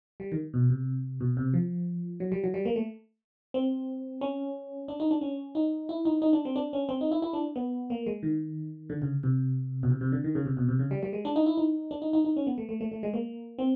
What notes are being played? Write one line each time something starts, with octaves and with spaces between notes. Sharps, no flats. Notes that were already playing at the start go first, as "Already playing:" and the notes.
G3
D#3
B2
C3
B2
C3
F3
F#3
G3
F#3
G3
A#3
A3
C4
C#4
D4
D#4
D4
C#4
D#4
E4
D#4
D#4
D4
C4
D4
C#4
C4
D#4
E4
E4
D4
B3
A#3
G#3
D#3
D3
C#3
C3
B2
C3
C3
D3
D#3
C#3
C3
B2
C3
C#3
G3
G3
G#3
D4
D#4
E4
D#4
D4
D#4
D#4
D#4
C#4
B3
A3
A3
A3
A3
G#3
A#3
C4